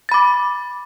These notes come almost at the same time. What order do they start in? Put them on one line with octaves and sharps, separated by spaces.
A6 B5 D6